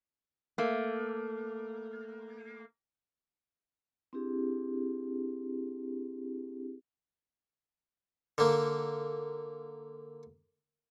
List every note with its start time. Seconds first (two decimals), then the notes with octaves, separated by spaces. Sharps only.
0.58 A3 A#3
4.13 C4 D4 E4 G4 G#4
8.38 D3 A#3